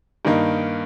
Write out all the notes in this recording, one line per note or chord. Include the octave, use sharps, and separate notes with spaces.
G2 D#3 A#3 D#4